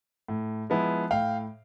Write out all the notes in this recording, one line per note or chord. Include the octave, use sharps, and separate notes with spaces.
A2
F3 G#3 B3 E4
A2 F5 G5